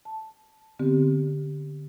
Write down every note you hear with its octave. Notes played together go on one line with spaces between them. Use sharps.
A5
D3 B3 C4 G4